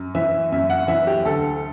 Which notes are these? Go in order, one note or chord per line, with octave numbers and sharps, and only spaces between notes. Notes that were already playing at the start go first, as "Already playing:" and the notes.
Already playing: F#2
E3 E5
F#2 E5
F#5
E3 E5
G4
D2 A4